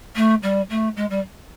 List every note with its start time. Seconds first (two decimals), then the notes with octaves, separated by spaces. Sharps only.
0.15 A3
0.43 G3
0.70 A3
0.96 G#3
1.10 G3